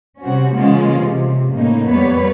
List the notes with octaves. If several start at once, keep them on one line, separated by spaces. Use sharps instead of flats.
C3 G3 C4 C#4 F#4
C#3 E3 G#3 A#3 C#4 F4
C3
A2 C#3 A#3 D#4
F2 G3 A#3 B3 B4 C#5